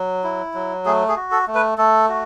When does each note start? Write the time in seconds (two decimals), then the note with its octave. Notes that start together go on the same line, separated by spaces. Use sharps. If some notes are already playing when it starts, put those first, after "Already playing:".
Already playing: F#3
0.24 E4
0.54 F#3
0.85 A3 G#4
1.08 G#4
1.16 F#4
1.31 A4
1.48 A3
1.55 B4
1.78 A3 A4
2.09 F#4